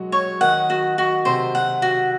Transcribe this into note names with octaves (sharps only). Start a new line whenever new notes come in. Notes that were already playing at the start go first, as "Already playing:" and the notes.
Already playing: F#3 G#3 F#4
C#5
D#3 D#4 F#5
F#4
F#4
C3 C4 C5
F#5
F#4